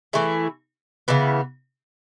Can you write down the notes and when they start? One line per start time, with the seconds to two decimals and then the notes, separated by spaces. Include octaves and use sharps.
0.13 E3 A3 E4 G#4
1.08 C#3 E3 B3